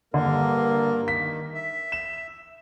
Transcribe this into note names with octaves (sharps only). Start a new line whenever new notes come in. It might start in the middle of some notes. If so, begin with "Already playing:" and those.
G2 D3 A#3 A#4
D#3 B6
E5
E7